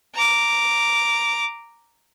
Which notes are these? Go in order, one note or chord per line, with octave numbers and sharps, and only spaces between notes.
A#5 D6